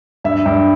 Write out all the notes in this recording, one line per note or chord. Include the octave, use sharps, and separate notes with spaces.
G2 E5
G2